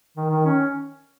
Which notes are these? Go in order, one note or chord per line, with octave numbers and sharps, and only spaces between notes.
D#3
D#3
C#4